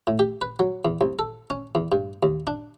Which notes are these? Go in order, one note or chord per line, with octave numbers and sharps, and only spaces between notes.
A2
G4
B4
F#3
E2
C2
A4
C#4
E2
G2
D#2
D4